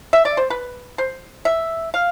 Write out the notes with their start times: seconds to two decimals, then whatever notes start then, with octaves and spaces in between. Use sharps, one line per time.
0.13 E5
0.25 D5
0.37 C5
0.50 B4
0.98 C5
1.45 E5
1.94 F5